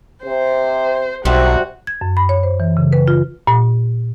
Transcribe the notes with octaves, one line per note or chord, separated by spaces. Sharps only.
C3 C5
B1 C3 G3 C4 F#4
G#6
F#2
B5
C#5
C5
E3
C#3
B4
F4
A#2